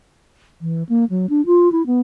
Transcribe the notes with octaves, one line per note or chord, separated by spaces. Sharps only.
E3
A#3
F#3
D4
F4
E4
B3